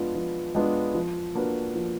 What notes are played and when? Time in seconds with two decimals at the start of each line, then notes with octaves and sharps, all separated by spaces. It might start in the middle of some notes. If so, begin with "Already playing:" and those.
Already playing: F3 G#3 B3 D4 F4
0.15 F3
0.55 G#3 B3 D4 F4
0.95 F3
1.35 A#3 D4 F#4 B4
1.75 F3